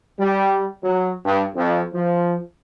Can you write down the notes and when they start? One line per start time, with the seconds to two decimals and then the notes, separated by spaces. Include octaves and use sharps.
0.18 G3
0.82 F#3
1.23 G2
1.55 F2
1.94 F3